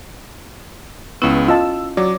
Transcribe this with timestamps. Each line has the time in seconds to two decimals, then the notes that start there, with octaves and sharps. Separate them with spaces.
1.22 C#2 B3 C#4 E4
1.48 F4 D#5 A5 E6
1.97 F#3 C#5 D5 D6